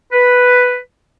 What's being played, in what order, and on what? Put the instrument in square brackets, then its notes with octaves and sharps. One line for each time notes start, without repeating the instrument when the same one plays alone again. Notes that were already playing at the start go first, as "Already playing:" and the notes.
[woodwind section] B4